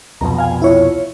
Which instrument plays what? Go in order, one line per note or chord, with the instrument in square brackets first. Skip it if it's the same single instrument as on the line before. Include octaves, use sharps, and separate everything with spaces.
[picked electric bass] C2 F2 B2 [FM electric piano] A#5
[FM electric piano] F5 G#5
E4 F4 C#5